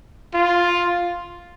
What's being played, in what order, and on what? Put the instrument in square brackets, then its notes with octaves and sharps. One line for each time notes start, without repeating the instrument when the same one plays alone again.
[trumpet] F4